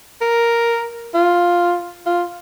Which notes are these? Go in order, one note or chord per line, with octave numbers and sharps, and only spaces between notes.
A#4
F4
F4